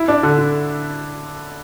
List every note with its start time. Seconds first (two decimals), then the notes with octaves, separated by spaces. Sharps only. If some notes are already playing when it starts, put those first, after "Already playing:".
Already playing: E4
0.08 D4
0.23 D3
0.38 D3